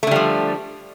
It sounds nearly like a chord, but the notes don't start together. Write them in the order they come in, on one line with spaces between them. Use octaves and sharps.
A3 D3 G3 F3